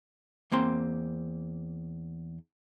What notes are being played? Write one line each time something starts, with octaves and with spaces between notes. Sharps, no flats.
E2 A#3 C4 C6